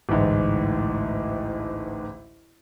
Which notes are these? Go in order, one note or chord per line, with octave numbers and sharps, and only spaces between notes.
A1 D2 G#2 E3